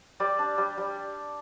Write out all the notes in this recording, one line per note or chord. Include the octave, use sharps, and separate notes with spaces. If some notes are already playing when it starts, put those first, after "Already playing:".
G3 D5
D4
G3
G3